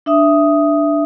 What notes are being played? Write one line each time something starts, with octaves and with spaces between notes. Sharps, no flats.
D4 E5 D#6